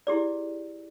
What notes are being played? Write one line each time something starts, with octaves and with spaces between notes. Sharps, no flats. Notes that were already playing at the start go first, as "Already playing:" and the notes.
E4 G4 G#4 D5